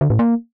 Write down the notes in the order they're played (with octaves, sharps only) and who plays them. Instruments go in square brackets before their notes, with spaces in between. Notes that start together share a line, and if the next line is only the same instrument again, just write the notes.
[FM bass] D3
A2
A#3